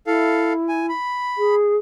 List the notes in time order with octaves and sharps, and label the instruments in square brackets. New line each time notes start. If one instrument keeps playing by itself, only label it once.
[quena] E4 [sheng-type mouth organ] A4 F5
[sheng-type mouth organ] G#5
B5
[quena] G#4